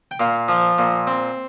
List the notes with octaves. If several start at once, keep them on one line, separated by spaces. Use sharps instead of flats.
G5
A#2 F5
F3
A#2
C4